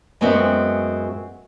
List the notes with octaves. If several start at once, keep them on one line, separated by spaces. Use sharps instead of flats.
F#2 G#3 B3 C4 F#4 E5